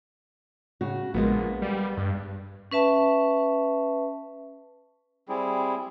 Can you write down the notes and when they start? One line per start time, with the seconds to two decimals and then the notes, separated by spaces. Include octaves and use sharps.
0.81 A2 C#3 F#4
1.14 A#1 G#3 A#3 B3
1.62 G3
1.97 G2
2.71 C#4 B4 E5 A5
5.28 G3 C4 E4 G#4